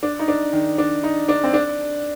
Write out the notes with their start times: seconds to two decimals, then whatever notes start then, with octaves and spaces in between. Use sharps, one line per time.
0.03 D4
0.19 D#4
0.28 D4
0.53 D#3
0.78 D4
1.04 D#4
1.29 D4
1.44 C4
1.54 D4